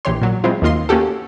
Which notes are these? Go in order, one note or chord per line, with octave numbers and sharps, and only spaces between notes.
A#1 E3 G4 C#5 C6
A#2 F#3
F#3 G#3 C4 E4 F4
D#2 D#3 A#3 F4 D#5 C6
A#3 C#4 F#4 G4 A4